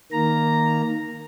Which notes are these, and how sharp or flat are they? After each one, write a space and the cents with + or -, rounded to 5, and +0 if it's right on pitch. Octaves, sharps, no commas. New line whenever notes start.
D#3 +0 A#3 +0 A#5 -5